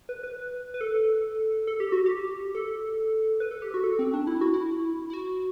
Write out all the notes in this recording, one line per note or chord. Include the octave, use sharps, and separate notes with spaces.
B4
B4
B4
A4
A4
G4
F#4
G4
A4
B4
A4
G4
F#4
A4
C4
D4
E4
F#4
E4
E4
F#4